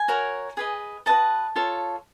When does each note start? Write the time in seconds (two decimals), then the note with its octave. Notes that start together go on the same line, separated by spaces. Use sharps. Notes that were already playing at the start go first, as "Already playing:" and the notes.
Already playing: G#5
0.08 F#4 A#4 C#5
0.57 G#4 B4 D#5
1.06 F#4 A4 B4 D#5 A5
1.56 F4 A4 C#5